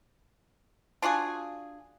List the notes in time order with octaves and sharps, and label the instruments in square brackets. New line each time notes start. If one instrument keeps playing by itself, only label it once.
[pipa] D4 F4 F#4 G#4